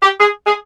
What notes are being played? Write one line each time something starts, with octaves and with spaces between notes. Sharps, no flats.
G4
G#4
G#4